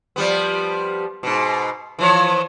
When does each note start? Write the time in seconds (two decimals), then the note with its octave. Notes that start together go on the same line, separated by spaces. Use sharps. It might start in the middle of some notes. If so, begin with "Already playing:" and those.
0.16 F3 G3 B3
1.23 G#2 B2
1.99 E3 F3 C#5